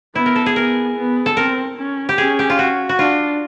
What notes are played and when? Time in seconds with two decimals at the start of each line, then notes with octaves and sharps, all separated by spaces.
0.15 B3 E4
0.26 A#4
0.36 A4
0.46 G#4
0.56 B3 A#4
0.97 B3
1.26 A4
1.37 C4 A#4
1.78 C#4
2.09 G4
2.18 C#4 G#4
2.39 G4
2.50 F4
2.59 F#4
2.89 F#4
2.99 D4 F4